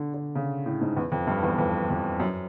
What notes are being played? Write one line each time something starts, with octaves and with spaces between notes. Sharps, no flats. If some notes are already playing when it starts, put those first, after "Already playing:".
Already playing: D3
D3
C#3
A2
G#2
E2
F2
G2
E2
F2
F2
F#2